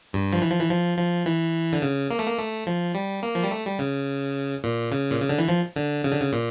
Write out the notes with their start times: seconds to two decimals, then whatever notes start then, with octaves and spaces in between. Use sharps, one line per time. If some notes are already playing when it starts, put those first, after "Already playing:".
0.13 G2
0.33 F3
0.42 E3
0.51 F3
0.60 E3
0.70 F3
0.98 F3
1.26 E3
1.72 D3
1.82 C#3
2.10 A#3
2.19 A3
2.27 A#3
2.38 A3
2.67 F3
2.95 G3
3.23 A#3
3.35 F3
3.43 G3
3.51 A3
3.65 G3
3.79 C#3
4.64 A#2
4.92 C#3
5.10 A#2
5.20 C#3
5.29 D3
5.38 E3
5.48 F3
5.76 D3
6.04 C#3
6.12 D3
6.20 C#3
6.32 A#2